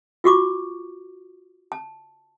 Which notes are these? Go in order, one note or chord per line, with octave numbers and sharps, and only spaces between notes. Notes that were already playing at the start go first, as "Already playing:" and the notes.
F4 F#4 C#6 D6
A5